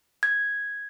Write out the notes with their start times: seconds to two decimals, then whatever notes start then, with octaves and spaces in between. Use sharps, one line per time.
0.23 G#6